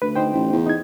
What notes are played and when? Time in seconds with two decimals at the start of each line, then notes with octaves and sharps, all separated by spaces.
0.02 D2 B4
0.16 D#4 C5 G5
0.33 A1
0.52 E2
0.66 D#4 G#6